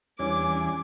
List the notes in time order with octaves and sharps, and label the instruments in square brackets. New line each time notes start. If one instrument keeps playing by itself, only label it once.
[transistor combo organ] E2 D4 G#5 [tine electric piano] E3 G3 C#4 [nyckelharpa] D6